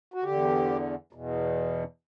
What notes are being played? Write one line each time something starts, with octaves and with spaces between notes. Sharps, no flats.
F#4
E2 D3 G4
E2 B2